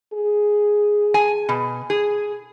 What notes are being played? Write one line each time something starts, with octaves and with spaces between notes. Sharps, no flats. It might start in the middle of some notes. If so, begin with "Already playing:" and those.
G#4
G#5
B2
G#4